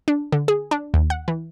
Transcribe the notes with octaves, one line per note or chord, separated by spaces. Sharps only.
D4
D3
G#4
D4
D#2
F#5
E3